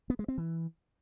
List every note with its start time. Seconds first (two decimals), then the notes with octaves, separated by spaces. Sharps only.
0.10 B3
0.19 G#3
0.28 C4
0.38 E3